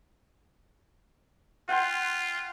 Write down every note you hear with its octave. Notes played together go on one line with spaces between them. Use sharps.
F4 F#5 G5 C6